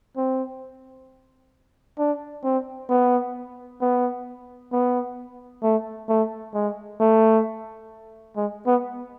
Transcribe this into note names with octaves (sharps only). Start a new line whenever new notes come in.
C4
D4
C4
B3
B3
B3
A3
A3
G#3
A3
G#3
B3